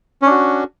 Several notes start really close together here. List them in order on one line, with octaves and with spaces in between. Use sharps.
C#4 D4 F#4